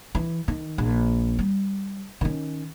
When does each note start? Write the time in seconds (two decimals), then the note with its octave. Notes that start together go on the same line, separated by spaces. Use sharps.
0.15 E3
0.48 D#3
0.78 A#1
1.39 G3
2.21 D#3 C#4